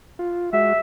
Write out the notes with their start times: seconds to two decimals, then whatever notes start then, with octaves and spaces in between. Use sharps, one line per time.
0.19 F4
0.53 G#3 F#4 E5